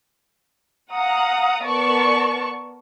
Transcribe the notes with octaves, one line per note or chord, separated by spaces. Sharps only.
F5 F#5 A#5 D#6
B3 A#4 D5 A5 C#6